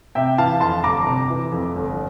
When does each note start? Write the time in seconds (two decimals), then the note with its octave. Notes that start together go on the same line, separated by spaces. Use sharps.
0.15 C3 E5 G5
0.38 E3 F5 A5
0.60 F2 A5 C6
0.84 G1 A#5 D6
1.07 C3
1.30 E3
1.52 F2
1.76 G1